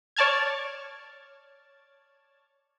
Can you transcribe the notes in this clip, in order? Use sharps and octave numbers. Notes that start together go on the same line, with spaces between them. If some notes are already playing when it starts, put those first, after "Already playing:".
C#5 D5 A5 F6 G#6